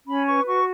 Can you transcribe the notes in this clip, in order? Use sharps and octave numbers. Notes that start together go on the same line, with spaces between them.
C#4 B5
B4 C#6
F#4 C#6